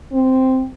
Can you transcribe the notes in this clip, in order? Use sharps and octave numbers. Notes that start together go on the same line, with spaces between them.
C4